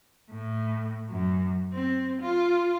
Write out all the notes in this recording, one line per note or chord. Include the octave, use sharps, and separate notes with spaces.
A2
F#2
C4
F4